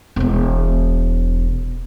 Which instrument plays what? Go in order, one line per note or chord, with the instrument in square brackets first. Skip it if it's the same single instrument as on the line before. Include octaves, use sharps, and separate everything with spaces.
[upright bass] E1 B3